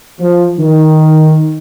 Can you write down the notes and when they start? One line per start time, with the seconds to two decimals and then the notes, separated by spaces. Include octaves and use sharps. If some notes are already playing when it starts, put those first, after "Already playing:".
0.20 F3
0.60 D#3